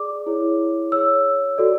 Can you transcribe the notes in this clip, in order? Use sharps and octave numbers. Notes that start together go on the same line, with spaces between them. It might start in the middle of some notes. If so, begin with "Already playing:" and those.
Already playing: G#4 D5 D6
E4 G#4 C#5
G#4 C#5 E6
F#4 A4 D5